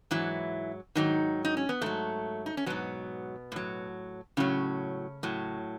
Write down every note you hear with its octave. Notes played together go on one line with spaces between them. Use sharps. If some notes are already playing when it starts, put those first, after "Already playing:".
G#2 E3 F#3 E4
G#2 D#3 F#3 D#4
D#4
C#4
B3
G#2 F#3 A3
D#4
C#4
G#2 B2 F#3 B3
A2 F#3
A2 C#3 F#3 C#4
A2 F#3